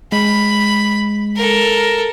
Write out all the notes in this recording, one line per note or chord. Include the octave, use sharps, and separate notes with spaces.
G#3 B5
A4 A#4